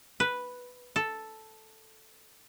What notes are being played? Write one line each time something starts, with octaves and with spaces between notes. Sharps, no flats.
B4
A4